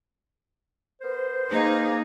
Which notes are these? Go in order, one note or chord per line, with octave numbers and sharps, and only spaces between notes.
B3 A#4 C5
A#3 D#4 G#4